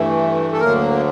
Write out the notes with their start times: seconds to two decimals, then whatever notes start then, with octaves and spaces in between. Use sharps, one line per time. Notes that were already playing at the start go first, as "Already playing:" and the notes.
Already playing: G2 E3 A3
0.53 A4
0.60 D2 D3 F#3 A#3 A#4